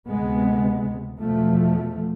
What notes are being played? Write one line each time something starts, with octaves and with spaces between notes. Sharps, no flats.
D2 C3 G#3 B3
E2 B2 F3 A3